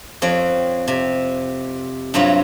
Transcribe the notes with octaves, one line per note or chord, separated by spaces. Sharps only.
F2 C4 C#5
C3
G2 C3 F#3 F4 C#5